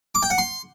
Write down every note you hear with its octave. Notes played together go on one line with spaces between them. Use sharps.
D6
G5
F#5
C6